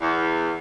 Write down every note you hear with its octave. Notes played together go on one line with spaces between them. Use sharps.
E2